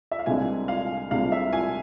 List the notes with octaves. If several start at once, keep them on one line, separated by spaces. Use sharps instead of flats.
E5
F5
C2 C3 G#3 D4 G#5
F5
C2 C3 G#3 D4 F5
E5
G#5